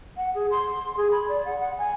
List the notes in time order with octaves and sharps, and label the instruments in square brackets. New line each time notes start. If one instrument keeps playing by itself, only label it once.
[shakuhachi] F#5
G#4
C6
C6
G#4
B5
D5
F#5
F#5
G#5